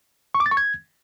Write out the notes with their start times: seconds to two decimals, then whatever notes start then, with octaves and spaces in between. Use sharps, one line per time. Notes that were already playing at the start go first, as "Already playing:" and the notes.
0.35 C#6
0.40 D6
0.46 A6
0.51 C#6
0.57 G#6